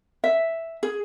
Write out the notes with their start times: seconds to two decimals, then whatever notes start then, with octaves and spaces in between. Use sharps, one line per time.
0.24 E5
0.83 G#4